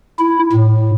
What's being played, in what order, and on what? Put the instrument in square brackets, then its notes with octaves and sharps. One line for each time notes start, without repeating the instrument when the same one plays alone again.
[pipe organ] E4
A2